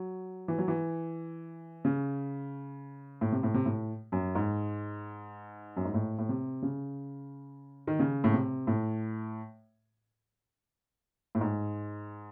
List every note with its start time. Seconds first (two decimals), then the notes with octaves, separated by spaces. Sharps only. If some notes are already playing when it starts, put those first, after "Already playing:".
Already playing: F#3
0.48 E3
0.58 F#3
0.68 E3
1.85 C#3
3.21 A2
3.32 C3
3.43 A2
3.54 C3
3.66 A2
4.12 F#2
4.35 G#2
5.77 F#2
5.85 G#2
5.94 A2
6.19 A2
6.29 C3
6.62 C#3
7.87 D#3
7.99 C#3
8.24 A2
8.34 C3
8.67 A2
11.35 A2
11.41 G#2